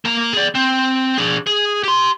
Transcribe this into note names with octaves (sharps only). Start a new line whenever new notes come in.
A#3 A#5
G#4 D5
C4
D4 G#4
G#4
G4 C6